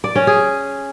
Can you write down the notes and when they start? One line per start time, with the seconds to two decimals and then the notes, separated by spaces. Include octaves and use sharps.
0.04 D5
0.15 C#4
0.27 G#4